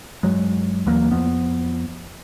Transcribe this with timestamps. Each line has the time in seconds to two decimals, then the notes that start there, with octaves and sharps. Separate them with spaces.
0.23 G2 F#3 G#3
0.86 D#2 E3 F#3 A#3
1.11 F2 F3 B3